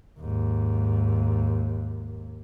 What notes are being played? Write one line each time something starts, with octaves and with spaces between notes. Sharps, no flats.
D#2 G#2